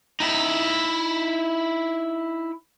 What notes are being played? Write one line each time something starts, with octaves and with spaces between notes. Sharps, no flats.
D#4 E4